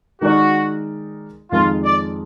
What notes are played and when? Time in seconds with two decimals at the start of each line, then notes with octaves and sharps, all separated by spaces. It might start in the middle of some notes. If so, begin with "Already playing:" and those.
0.21 D#3 G#3 D#4 F#4 A#4 D5
1.51 F2 D#3 G#3 D#4 F4 A#4
1.84 D5